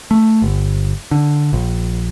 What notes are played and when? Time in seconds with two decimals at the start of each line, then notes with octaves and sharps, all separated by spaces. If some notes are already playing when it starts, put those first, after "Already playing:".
0.11 A3
0.42 G1
1.11 D3
1.53 A#1